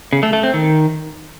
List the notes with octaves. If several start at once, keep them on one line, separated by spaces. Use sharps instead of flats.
C#3
A3
A3
C4
D#3